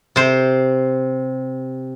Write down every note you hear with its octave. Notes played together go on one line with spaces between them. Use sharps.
C3 C5